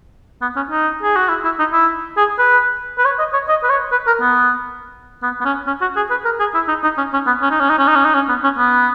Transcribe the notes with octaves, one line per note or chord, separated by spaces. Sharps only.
B3
C#4
D#4
G#4
F#4
E4
E4
D#4
E4
G#4
B4
B4
C#5
D#5
C#5
D#5
B4
C#5
B4
A#4
B3
B3
B3
C#4
C#4
F#4
G#4
B4
A#4
G#4
E4
D#4
D#4
C#4
C#4
B3
C#4
D#4
C#4
D#4
C#4
D#4
C#4
D#4
C#4
B3
C#4
B3